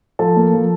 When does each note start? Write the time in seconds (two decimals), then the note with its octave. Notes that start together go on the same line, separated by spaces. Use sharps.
0.19 F3 A4
0.36 A#3
0.54 F3